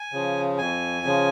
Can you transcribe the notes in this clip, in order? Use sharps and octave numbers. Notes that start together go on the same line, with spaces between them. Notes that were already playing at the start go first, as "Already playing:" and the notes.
Already playing: G#5
C#3 F3
F2 G#5
C#3 F3